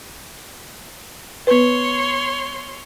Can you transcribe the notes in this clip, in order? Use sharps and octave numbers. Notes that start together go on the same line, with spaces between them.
B3 B4 C#5 C6